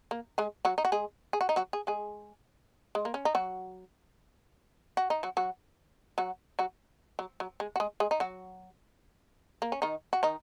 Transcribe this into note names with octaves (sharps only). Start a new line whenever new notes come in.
A#3
G#3 G#4
F#3 F#4
D#4
F#4
G#3 G#4
G#4
F#4
D#4
F#3 F#4
G#4
G#3 G#4
G#3
A#3
C#4
D#4
F#3 F#4
F#4
D#4
F#3 F#4
F#3 F#4
F#3 F#4
F#3 F#4
F#3
F#3
G#3
F#4
G#3 G#4
G#3 G#4
D#4
F#3 F#4
A#3
C#4
D#3 D#4
F#4
D#3 D#4